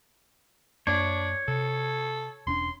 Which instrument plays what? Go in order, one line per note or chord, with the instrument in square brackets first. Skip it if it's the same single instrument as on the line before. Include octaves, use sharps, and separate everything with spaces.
[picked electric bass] F#2 A#3 [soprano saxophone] D4 [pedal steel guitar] C#5
[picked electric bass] C3 [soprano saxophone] A4
[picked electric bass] E1 C#4 D4 [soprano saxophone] C6